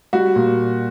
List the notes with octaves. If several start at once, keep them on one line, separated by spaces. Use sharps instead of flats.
G3 F#4
A#2